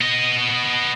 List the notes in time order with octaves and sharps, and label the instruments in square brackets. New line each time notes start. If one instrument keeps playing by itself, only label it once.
[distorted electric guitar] B3 D#5